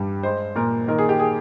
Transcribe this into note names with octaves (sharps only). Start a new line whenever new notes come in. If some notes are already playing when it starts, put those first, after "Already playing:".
Already playing: G2 G3
G#3 C5
A#2 A#4
D#3 A#4
G#4
G4
G#4